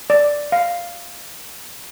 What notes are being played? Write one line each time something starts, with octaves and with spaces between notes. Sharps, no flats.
D5
F5